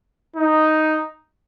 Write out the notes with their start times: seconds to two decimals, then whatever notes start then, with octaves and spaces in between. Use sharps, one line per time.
0.36 D#4